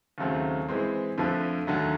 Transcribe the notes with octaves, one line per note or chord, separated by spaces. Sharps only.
D#2 C#3 F#3 A3 C4
E3 G#3 C4
F2 D3 F3 A3
D#2 D3 F#3 A3